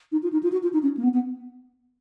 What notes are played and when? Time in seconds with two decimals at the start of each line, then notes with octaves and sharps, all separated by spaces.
0.12 D#4
0.23 F4
0.32 D#4
0.43 F4
0.52 F#4
0.63 F4
0.73 D#4
0.83 C#4
0.97 A#3
1.03 B3
1.13 B3